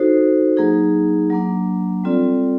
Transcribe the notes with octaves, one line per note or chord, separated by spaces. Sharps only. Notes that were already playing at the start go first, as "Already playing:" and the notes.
Already playing: D#4 F#4 A4 C5
F#3 A#3 D#4 G#4
F#3 A#3 D4
G3 C4 F4 A4 D5